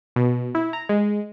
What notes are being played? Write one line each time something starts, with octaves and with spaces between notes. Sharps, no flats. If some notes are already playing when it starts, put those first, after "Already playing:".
B2
E4
A#5
G#3